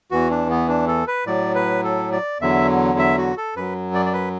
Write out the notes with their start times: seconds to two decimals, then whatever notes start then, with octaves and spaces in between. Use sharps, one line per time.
0.11 E2 E3 F#4
0.30 D4
0.50 B3
0.68 D4
0.88 A4
1.07 B4
1.26 A2 F#3 D5
1.55 B4
1.84 A4
2.12 D5
2.41 E2 D3 F#3 E5
2.99 E5
3.18 F#4
3.37 A4
3.56 F#2 F#3 B4
3.94 D5
4.06 D5
4.13 B4